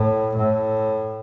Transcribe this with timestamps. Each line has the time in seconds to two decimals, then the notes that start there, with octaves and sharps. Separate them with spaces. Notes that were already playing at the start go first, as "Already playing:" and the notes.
Already playing: A2
0.36 A2